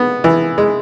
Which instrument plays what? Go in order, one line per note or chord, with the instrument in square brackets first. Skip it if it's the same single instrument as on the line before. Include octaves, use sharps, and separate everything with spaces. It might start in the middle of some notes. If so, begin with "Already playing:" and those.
Already playing: [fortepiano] B3
E3
G#3